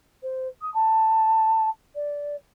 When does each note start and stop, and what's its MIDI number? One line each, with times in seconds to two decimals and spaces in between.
0.22 0.48 72
0.61 0.72 87
0.74 1.69 81
1.95 2.36 74